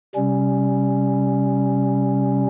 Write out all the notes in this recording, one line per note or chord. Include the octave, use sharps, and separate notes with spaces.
C3 G3 C#4